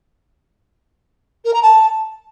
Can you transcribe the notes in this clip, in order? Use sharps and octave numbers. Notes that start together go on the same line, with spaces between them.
A#4
A#5
A5